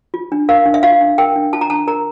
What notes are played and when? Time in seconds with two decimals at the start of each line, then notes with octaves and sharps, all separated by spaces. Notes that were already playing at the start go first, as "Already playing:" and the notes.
0.14 F4
0.32 D4
0.49 A#4 F5
0.66 D4
0.74 E5
0.83 F4 F5
1.01 D4
1.18 A#4 G5
1.36 D4
1.53 F4 A5
1.61 A#5
1.70 D4 A5
1.87 A#4 A#5